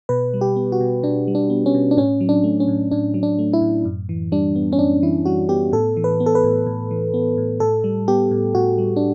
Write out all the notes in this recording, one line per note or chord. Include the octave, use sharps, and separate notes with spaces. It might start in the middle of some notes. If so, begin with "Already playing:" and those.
B2 B4
G3
G4
B3
F#4
B2
B2 D4
G3
D4
B3
C#4
B2
D4
A2 C#4
F#3
D4
A3
C#4
A2
A2 D4
F#3
D4
A3
E4
A2
F#2
E3
G3 D4
B3
C#4
F#2 D4
E3 E4
G3 F#4
B3 G4
A2 A4
E3
B4
B3
A4
B4
A2
A2
E3
B3
A2
A2 A4
G3
B3 G4
A2
A2 F#4
G3
D4